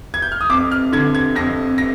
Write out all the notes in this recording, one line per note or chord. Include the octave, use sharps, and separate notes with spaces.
G#6
G6
F6
D#6
F2 D6
F6
D3 G#6
G#6
F2 A#6
A#6